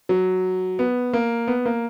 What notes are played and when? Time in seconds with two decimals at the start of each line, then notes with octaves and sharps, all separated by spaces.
0.09 F#3
0.79 B3
1.13 A#3
1.48 B3
1.65 A#3